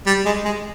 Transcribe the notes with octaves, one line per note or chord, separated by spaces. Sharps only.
G3
G#3
G#3